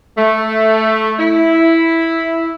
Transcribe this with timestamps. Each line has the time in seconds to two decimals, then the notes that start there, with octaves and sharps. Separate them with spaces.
0.18 A3
1.20 E4